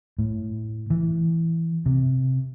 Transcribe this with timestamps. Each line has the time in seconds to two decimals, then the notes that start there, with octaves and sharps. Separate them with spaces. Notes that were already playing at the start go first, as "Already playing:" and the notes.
0.19 A2
0.90 E3
1.86 C3